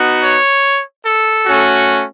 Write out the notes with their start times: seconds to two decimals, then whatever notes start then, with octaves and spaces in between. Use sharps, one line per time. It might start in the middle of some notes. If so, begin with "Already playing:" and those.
Already playing: B3 D#4 F#4
0.22 C#5
1.05 A4
1.46 A3 C#4 F#4